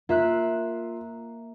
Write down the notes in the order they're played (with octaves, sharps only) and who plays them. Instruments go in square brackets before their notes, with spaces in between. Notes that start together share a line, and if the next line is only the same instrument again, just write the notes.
[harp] A#3 E5 F#6 [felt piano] F4